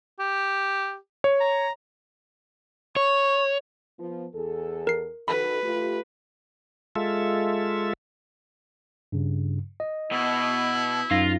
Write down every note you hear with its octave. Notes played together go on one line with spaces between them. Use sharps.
G4
C#5
A#5
C#5 C#6
F3 B3
E2 G#4 A4
A#4 C7
D#3 F#4 A4 B4 B5
A3 F4 G4
G#3 F4 A4 E5
G2 C#3
D#5
B2 E4
F#2 D#4 F4 A#6